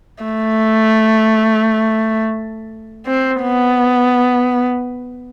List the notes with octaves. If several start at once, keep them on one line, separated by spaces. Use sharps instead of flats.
A3
C4
B3